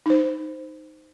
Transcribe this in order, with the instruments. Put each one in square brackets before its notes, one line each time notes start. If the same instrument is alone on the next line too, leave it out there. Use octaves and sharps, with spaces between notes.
[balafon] D#4 C5